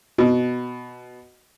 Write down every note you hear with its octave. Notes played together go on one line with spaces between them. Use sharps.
B2